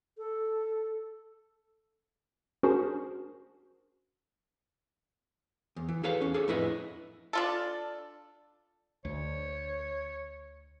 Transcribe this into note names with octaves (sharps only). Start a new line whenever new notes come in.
A4
C#4 D4 F#4 G#4 A#4 C5
E2
E3
E4 G#4 A4 B4 C#5 F5
E2 C#4
D4 G#4 A4 C#5
F2 A2 E4 B4 D#5 E5
D4 F4 A4
D2 C#5